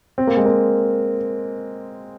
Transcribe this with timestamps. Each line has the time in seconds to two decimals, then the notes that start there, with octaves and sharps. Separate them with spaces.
0.18 C4
0.27 A#3
0.37 G#3
0.46 A#3